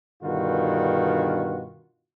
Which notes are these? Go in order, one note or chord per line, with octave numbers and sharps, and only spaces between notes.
G2 B2 D3 D#3 F4 F#4